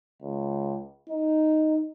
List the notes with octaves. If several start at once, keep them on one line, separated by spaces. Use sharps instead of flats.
C#2
D#4